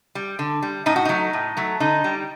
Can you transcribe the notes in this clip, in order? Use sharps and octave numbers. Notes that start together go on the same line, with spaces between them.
G3
D3
G3
A2 D#4
F#4
F#3 A3 D#4
A2
F#3 A3
D3 D#4
G3